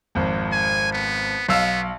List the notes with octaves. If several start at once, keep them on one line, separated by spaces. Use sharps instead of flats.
G#1 F2
G#5
B3
B1 B3 F5 E6